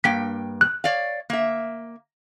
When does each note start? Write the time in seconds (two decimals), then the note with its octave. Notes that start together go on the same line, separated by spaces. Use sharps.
0.04 G2 A#3 G5 B6
0.61 F#6
0.84 C#5 D5 F5
1.30 A#3 E5